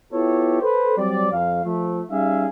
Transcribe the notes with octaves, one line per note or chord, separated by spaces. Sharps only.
B3 E4 F4 G4 A4 C#5
A4 B4 C5
F#3 G3 C4 D5
F2 F5
F3 A3
G3 C#4 D#4 G#4 E5 F5